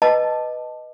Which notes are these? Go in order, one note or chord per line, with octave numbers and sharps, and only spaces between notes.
B4 D#5 A5 D6